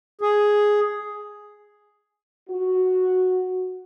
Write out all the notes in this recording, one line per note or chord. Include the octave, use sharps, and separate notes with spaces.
G#4
F#4